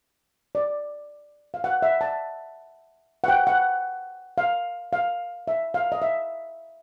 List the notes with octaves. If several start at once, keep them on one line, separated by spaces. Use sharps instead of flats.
D5
F5
F#5
E5
A5
F#5
G5
F#5
F5
F5
E5
F5
D#5
E5